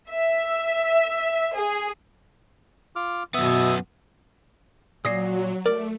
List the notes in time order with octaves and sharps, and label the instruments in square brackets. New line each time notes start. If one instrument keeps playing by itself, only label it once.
[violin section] E5
G#4
[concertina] F4 D6 F6
[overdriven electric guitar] F#2 B3 [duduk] B2 [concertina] E5 D#6
[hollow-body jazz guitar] A#2 [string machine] F#3 [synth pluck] D#6 A#6 C7
[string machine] A3 [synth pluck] A#4 [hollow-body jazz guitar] D5